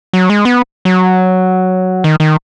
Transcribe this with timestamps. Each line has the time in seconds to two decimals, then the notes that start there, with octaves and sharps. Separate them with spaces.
0.13 F#3
0.30 G#3
0.45 B3
0.85 F#3
2.04 D#3
2.20 D#3